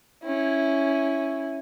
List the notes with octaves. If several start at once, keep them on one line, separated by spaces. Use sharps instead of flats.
C#4 E4